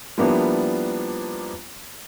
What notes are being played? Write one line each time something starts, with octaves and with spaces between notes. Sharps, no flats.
F3 G3 A#3 B3 D4 E4